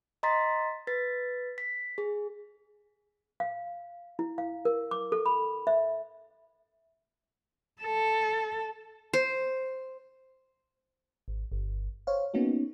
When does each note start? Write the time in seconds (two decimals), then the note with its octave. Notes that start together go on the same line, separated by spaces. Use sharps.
0.23 D#5 A#5 C6 A6 B6
0.87 B4 A6 B6
1.58 B6
1.98 G#4
3.40 F5
4.19 E4
4.38 F5
4.65 A#4
4.91 D6
5.12 A4
5.26 B5
5.67 E5
7.82 A4
9.13 C5
11.28 G#1
11.52 G1
12.07 C5 C#5 F5
12.34 A#3 B3 C#4 D#4 F#4